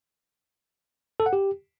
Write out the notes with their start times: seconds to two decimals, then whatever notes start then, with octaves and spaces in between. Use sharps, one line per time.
1.20 A4
1.26 F#5
1.33 G4